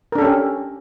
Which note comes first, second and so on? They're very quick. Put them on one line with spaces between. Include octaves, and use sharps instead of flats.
A#4 D4 A4 C#4 G4